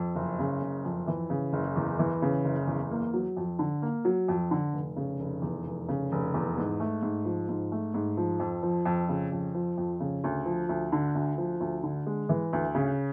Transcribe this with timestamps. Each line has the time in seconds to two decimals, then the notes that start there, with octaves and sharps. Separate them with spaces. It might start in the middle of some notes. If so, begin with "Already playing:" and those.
Already playing: F2
0.16 F#1
0.39 C#3
0.62 F#1
0.84 F2
1.07 E3
1.30 C#3
1.53 F#1
1.76 E2
1.99 E3
2.22 C#3
2.44 F#1
2.67 E2
2.91 A#3
3.14 F#3
3.37 F2
3.59 D3
3.82 A#3
4.05 F#3
4.28 F2
4.51 D3
4.74 F1
4.97 C#3
5.20 F1
5.42 E2
5.66 F1
5.89 C#3
6.12 F1
6.34 E2
6.57 G#2
6.80 A3
7.02 G#2
7.25 F3
7.49 G#2
7.72 A3
7.94 G#2
8.17 F3
8.40 F2
8.63 F3
8.85 F2
9.09 C#3
9.32 F2
9.54 F3
9.78 F2
10.00 C#3
10.24 D2
10.46 F3
10.69 D2
10.92 D3
11.15 D2
11.38 F3
11.60 D2
11.83 D3
12.06 G#3
12.29 E3
12.53 D2
12.75 C#3